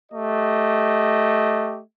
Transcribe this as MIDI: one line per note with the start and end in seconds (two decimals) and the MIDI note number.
0.12 1.80 57
0.12 1.80 67
0.12 1.80 75